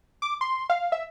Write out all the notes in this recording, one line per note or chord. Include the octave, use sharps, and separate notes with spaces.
D6
C6
F5
E5